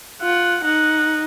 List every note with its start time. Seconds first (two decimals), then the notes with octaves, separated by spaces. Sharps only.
0.22 F4 F#5
0.64 D#4 F#5